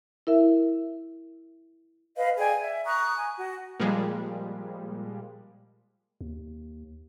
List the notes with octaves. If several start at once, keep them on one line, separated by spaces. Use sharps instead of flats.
E4 A#4 E5
B4 D#5 F5
G#4 D5 G5 G#5
E5
A#5 C#6 D#6 F#6
G#5
F#4
A#2 F3 G3 G#3
D#2